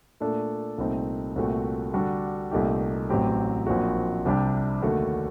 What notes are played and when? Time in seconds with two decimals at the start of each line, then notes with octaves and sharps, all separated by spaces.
0.20 A#2 A3 D4 A4
0.78 C2 A#2 A3 C4 D#4
1.36 C2 A#2 A3 C4 F#4
1.94 D3 G3 D4 F#4 A4
2.51 C2 A#2 A3 D#4 G4
3.10 A1 A2 F#3 C4 G4
3.66 A#1 A#2 F#3 C4 F#4
4.25 C2 C3 G3 D4 G4
4.82 D#2 D3 A3 D4 F#4